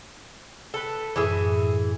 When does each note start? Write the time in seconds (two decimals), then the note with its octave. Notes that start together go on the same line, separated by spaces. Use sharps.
0.74 A4 B4
1.16 F#2 A2 E3 G#4 E5